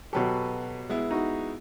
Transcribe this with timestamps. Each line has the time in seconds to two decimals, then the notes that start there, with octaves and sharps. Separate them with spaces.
0.13 B2 F#3 G4 A4 B4
0.90 G#3 B3 E4
1.11 D#4 F#4